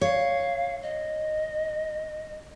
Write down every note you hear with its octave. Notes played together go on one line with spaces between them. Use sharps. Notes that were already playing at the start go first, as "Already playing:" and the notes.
C#5 F5
D#5